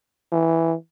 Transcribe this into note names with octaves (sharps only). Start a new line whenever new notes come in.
E3